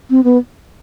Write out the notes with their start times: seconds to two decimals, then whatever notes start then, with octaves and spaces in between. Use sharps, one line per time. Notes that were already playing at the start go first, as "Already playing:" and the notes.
0.10 C4
0.24 B3